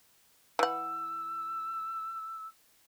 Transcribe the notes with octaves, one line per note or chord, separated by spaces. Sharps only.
E3 F#5 E6